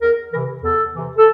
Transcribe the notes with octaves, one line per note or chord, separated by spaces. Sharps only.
E2 A#4
C3 E3 A#4
E2 A4
C3 E3
A4